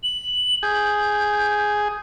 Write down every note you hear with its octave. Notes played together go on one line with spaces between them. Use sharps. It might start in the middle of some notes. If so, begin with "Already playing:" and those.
F#7
G#4 G6